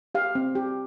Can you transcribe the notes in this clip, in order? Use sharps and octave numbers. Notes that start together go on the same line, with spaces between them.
G4 F5
C4
G4